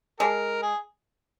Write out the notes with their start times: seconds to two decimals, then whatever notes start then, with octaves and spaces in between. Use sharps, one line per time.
0.20 G#3 G4 A#4
0.62 G#4